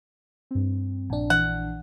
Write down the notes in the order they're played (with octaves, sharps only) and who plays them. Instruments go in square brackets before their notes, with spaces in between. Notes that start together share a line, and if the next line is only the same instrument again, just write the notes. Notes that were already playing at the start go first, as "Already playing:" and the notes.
[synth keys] G2 C4
[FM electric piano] A#1 D4
[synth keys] E3 [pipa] F#5